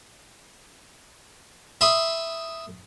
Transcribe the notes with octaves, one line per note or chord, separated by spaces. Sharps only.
E5 B5 C6 D#6